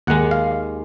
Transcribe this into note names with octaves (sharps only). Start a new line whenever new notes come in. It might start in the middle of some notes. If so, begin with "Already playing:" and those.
D#2 D#3 G#3 F#5
F5